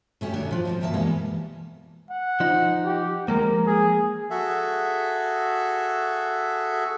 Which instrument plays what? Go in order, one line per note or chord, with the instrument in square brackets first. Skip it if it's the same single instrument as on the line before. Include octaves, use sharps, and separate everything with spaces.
[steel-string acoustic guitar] B2 A3 C#4 G4
D#2 D#3 D4 F#4 C#5
A#2 F3
G#2 B2 D#4
D2 D#3 A#3 E5 G5 A5
B2 E3 G3 G#3 A#3 B3
[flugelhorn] F#5
[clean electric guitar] F3 D#4
[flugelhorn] G4
[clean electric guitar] F3 G#3 A#3 [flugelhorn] A#4
[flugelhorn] G#4
[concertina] F#4 G#4 A4 E5